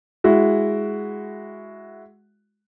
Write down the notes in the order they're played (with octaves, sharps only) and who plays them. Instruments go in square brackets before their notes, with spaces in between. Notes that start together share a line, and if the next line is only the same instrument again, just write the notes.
[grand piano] G#3 E4 F#4